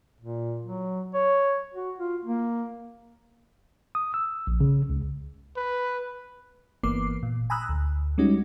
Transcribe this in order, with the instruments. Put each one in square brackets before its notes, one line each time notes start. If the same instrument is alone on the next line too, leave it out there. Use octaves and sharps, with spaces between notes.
[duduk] A#2
F#3
C#5
F#4
F4
A#3
[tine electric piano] D#6
E6
A#1
C#3
C#2
[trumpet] B4
[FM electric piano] G1 E3 A#3 B3 D6 C7
A#2
G#5 A#5 B5 D#6 E6 F#6
D2
G3 G#3 C#4 D#4 F#4